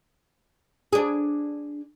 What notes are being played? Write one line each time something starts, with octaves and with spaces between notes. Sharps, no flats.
D4 G#4